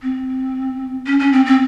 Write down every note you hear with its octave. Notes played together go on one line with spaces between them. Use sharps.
C4
C#4
C#4
C4
C4